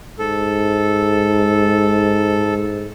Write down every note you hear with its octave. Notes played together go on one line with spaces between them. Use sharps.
G#2 A4